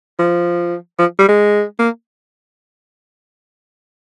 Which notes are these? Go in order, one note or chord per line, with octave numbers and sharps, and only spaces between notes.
F3
F3
G3
G#3
A#3